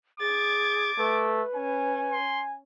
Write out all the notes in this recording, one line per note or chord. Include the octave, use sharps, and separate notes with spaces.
G#4 D6 G#6 A6
A3 B4
C#4 G#5
C6